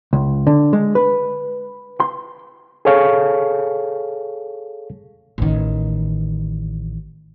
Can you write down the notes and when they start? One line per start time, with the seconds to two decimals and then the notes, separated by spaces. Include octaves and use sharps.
0.13 C#2
0.47 D3
0.73 G#3
0.95 B4
2.00 C6
2.85 G#4 A4 C#5 F5 C#6
5.38 A1 D#3